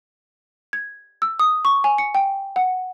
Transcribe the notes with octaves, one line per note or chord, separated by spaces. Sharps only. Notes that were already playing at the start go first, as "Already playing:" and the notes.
G#6
E6
D#6
C#6
G#5
C#7
G5
F#5